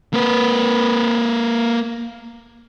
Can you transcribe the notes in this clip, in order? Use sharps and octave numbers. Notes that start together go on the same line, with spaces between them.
A#3 B4